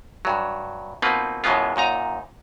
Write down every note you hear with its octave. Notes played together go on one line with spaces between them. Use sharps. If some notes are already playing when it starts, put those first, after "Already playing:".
G2 F#3
B2 A#3 C4 D#4 F4 B4
F#2 B2 E3 G#3 B3 F4
F#2 A#2 D#4 A#5